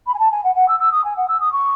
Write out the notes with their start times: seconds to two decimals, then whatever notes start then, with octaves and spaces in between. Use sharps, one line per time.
0.06 B5
0.14 G#5
0.19 A5
0.31 G#5
0.44 F#5
0.55 F#5
0.68 E6
0.79 E6
0.91 D#6
1.04 G#5
1.16 F#5
1.28 E6
1.40 D#6
1.52 C#6